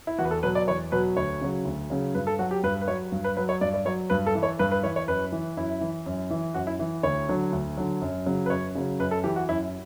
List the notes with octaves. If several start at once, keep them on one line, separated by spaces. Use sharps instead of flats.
E4
E2 F#4
B4
A4
B2 F#3 B4
D5
E2 C#5
B2 F#3 B4
D2 C#5
C#3 F#3
D2
C#3 F#3
G2 B4
A4
F#3 F#4
G4
G2 B4
B4
F#3 C#5
G2
B4
F#3 B4
C#5
G2 D5
D5
F#3 C#5
G2 B4
A4
E3
C#5
G2 B4
B4
E3 C#5
C#5
F#2 B4
E3
F#2 E4
E3
F#2
E3
F#2 F#4
E4
E3
D2 C#5
D3 F#3
D2
D3 F#3
F#2
C#3 F#3
B4
F#2 C#5
C#3 F#3
F#2 B4
A4
E3 G4
F#4
F#2 E4